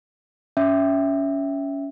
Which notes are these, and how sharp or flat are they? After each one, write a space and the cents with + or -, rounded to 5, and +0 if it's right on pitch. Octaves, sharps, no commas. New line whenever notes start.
C#4 +20 E5 +0